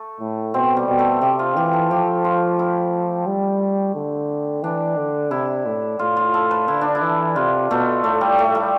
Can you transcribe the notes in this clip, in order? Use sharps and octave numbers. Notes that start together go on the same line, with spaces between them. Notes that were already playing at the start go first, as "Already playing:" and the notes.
Already playing: A3
A2
B2 C4
G3
B2
A3
C3 G4
F4
E3 G4
A4
F3 G4
F4
E4
G3
D3
E3 D4
D3
C3 E4
A2
A2 F4
F4
A4
B4
D3 E4
D4
E4
E3
C3 F4
B2 A3
A2 A3
G3
A3
G3